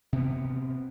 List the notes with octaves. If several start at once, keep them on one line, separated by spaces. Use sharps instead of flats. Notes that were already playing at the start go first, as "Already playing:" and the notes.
C3 B3